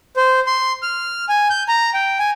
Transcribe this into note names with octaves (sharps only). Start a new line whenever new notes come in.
C5
C6
F6
G#5
G6
A#5
G5
G#5